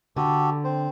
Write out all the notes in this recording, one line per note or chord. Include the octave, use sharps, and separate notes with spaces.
D3 F#4 G4 A4
C4 C5